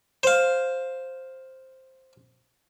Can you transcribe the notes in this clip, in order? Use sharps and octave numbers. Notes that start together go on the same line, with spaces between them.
C5 F5